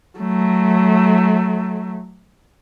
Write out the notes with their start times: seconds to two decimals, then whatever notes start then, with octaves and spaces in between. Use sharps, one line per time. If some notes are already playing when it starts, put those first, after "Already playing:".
0.19 F#3 A3